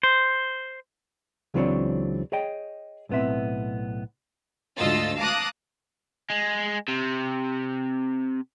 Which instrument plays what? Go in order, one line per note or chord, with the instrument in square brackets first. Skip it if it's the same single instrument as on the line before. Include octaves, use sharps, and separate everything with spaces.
[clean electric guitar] C5
[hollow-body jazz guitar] C#2 E3 F#3 C4 D4 C#5
G#4 C#5 D#5 G5
B1 A2 B3 C4 E5
[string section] D2 G#2 F4 D#5 E6 A6
F5 A5 A#5 D6 D#6 F#6
[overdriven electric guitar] G#3
C3